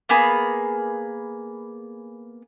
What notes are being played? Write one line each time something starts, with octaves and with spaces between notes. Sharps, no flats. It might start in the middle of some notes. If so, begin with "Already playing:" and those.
A#3 B3 G#4